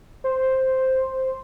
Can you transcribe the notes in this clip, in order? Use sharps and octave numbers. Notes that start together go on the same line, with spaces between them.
C5